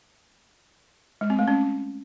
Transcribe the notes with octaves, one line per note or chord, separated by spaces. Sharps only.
G#3
C4
A3
C#4